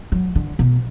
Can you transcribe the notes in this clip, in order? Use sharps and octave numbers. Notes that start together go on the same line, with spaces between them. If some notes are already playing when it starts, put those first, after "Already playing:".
F#3
D3
B2